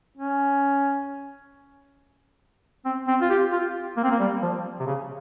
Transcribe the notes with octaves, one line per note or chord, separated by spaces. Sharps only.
C#4
C4
C4
F4
G4
F4
A#3
C4
A#3
G3
F3
C3
C#3